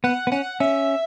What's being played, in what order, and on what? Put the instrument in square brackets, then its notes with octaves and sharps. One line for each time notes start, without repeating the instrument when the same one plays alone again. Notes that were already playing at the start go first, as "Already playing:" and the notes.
[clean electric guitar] B3 [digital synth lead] F#5
[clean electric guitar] B3
[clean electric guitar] C#4 [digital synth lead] F#5
[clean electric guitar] C#4 [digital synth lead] E5